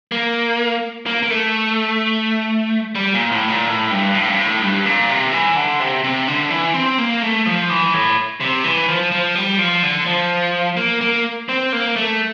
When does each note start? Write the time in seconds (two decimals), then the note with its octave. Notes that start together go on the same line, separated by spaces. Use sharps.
0.12 A#3
1.06 A#3
1.23 A#3
1.30 A3
2.95 G3
3.14 A#2
3.31 A2
3.49 A#2
3.67 A2
3.91 G2
4.14 A2
4.28 G2
4.39 A2
4.62 G2
4.86 A#2
5.09 C3
5.32 E3
5.56 D3
5.80 C3
6.04 C3
6.28 D3
6.51 E3
6.74 C4
6.98 A#3
7.22 A3
7.46 F3
7.69 E3
7.94 A2
8.40 C3
8.64 E3
8.89 F3
9.12 F3
9.35 G3
9.58 F3
9.83 D3
10.06 F3
10.77 A#3
11.01 A#3
11.49 C4
11.73 A#3
11.96 A3